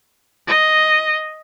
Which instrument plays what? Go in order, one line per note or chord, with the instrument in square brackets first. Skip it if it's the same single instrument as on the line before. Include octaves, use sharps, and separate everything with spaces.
[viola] D#5